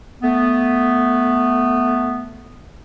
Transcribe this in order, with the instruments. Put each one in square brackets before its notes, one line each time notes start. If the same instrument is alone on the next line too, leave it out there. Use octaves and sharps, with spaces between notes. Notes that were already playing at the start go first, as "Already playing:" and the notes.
[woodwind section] A3 B3